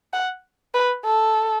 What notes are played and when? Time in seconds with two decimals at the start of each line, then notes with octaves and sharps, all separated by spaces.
0.13 F#5
0.74 B4
1.05 A4